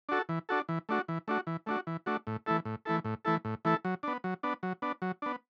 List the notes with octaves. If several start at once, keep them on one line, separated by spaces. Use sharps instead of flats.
D4 F#4 A4
E3
D4 F#4 A4
E3
A3 D4 F#4
E3
A3 D4 F#4
E3
A3 D4 F#4
E3
A3 D4 F#4
A2
E3 A3 E4 A4
A2
E3 A3 E4 A4
A2
E3 A3 E4 A4
A2
E3 A3 E4 A4
F#3
B3 D4
F#3
B3 D4
F#3
B3 D4
F#3
B3 D4